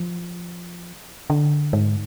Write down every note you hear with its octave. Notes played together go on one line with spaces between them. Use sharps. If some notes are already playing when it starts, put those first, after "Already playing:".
Already playing: F3
D3
G#2